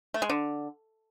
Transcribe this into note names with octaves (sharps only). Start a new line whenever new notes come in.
A3
G#3
D3